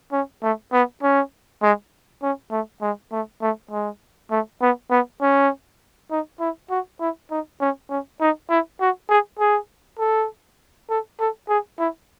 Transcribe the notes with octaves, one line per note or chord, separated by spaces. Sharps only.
C#4
A3
B3
C#4
G#3
C#4
A3
G#3
A3
A3
G#3
A3
B3
B3
C#4
D#4
E4
F#4
E4
D#4
C#4
C#4
D#4
E4
F#4
G#4
G#4
A4
A4
A4
G#4
E4